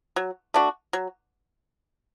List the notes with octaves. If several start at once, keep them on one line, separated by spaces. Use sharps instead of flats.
F#3
A3 D4 F#4
F#3